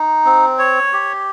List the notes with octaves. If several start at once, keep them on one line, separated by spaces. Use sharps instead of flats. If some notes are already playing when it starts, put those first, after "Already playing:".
Already playing: D#4
C4
C#5
G4